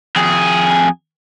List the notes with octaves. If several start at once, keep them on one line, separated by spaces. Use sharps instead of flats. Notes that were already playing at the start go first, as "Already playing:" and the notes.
F2 G#4